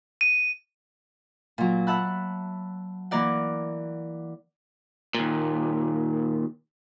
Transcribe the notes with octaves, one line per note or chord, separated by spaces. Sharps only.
D#7
A#2 F#3
E5 F#5 A5 B5 F#6
E3 A#3 A#4 D5 F#5
D#2 A#2